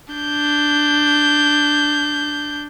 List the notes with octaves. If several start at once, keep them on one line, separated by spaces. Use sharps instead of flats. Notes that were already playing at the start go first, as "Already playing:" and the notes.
D4 G6